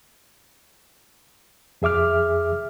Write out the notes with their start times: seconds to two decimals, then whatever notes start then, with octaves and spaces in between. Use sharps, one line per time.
1.82 F2 G#4 E5 D6 F6